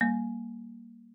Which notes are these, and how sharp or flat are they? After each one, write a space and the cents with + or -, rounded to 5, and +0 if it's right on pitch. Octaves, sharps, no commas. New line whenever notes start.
G3 +0 A#3 +5